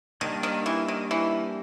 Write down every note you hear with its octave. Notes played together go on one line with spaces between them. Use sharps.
D#3 G3 A#3 D4
D#3
E3
D#3
E3